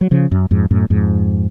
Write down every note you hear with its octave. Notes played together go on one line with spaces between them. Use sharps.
F#3
C#3 F3
F#2
F2 G#2
F#2 A2
F2 G#2